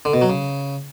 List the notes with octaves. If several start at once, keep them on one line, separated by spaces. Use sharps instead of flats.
D3
B2
F#3
C#3